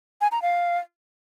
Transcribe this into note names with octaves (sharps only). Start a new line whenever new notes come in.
G#5
A#5
F5